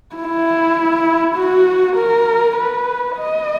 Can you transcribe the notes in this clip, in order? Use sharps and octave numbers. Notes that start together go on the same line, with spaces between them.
E4
F#4
A#4
B4
D#5